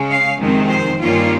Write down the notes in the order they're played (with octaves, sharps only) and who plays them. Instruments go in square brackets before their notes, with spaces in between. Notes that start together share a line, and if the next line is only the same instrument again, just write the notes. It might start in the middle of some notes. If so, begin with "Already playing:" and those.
Already playing: [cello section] C#3 G#3 C#4
F5
F2 C3 D#3 G#3 C4
C5
G2 D#3 G3 A#3 C#4 F4